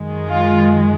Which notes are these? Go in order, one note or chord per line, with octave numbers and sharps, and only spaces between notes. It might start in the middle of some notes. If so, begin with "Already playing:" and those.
Already playing: F#2 D#3 G#3
F4